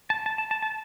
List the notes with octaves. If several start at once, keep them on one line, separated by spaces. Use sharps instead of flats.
A5
A5
A5
A5
A5